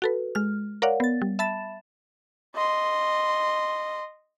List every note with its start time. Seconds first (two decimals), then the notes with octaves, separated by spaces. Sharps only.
0.02 F#4 A4 B4
0.35 G#3 F6
0.82 A#4 C#5 D5 F5 F#5
1.00 B3 A6
1.22 G3
1.39 E5 A5 B5 A6 E7
2.55 D#5 C6